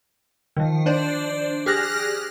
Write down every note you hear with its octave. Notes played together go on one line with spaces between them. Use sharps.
D#3 F3
D4 C5 D5
G4 G#4 F6 F#6 A#6